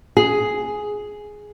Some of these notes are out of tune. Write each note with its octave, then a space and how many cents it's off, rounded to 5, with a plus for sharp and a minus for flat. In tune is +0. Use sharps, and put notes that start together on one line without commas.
G#4 +5